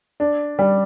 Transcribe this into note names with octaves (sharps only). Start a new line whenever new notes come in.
D4
G3